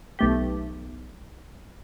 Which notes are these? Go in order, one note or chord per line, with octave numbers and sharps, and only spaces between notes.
B1 A3 G4